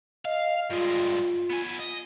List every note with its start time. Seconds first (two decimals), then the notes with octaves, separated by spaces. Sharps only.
0.25 D#5 F5
0.70 G2 G#3 F4
1.50 B3 G#5
1.80 D#5